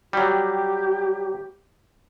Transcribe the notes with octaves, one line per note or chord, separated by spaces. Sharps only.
F#3 G3 G4